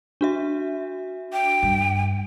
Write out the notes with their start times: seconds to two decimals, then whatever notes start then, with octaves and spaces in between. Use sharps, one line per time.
0.21 D4 F#4 E5
1.33 G5
1.63 G2